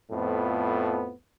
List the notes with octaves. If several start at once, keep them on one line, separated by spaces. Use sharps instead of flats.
F2 A2 F3 B3